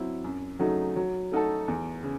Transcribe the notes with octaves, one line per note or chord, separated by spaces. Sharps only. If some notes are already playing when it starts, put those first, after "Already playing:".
Already playing: F#3 C4 E4
F#2
C#3 F#3 A3 D#4
F#3
A3 D#4 F#4 A4
E2
C#3